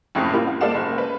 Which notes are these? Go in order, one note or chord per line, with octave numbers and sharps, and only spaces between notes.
F#1 F2 A2 C7
G3 A#3 F4
F5
G#3 A#3 A4 D5 F5 E7
F#1
B4